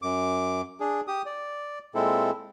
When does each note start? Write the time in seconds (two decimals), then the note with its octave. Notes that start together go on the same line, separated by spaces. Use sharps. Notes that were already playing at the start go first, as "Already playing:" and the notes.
0.02 F#2 D6
0.80 D4 G#4
1.08 G4 D#6
1.26 D5
1.95 A#2 G#3 C4 E4 A4